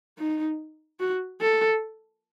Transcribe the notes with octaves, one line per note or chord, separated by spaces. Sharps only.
D#4
F#4
A4